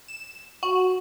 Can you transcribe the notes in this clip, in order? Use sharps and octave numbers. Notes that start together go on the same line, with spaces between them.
E7
F#4